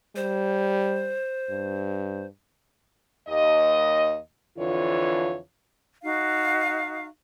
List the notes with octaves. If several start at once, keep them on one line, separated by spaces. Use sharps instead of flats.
G3 C5
G2
D#2 D#5
F2 D3 E3 F4 C#5
D#4 F#4 F5